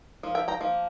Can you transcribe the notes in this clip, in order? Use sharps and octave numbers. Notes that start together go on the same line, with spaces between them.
F3 A#3
E5 G5
G5 A#5
F3 A#3